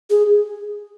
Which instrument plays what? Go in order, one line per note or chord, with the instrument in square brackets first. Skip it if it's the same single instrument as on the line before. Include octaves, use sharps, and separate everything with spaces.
[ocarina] G#4